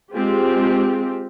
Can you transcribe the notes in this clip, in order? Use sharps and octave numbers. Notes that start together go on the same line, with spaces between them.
G#3 C4 F4 G4